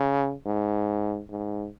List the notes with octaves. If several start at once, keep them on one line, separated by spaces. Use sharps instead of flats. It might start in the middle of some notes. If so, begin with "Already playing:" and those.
Already playing: C#3
G#2
G#2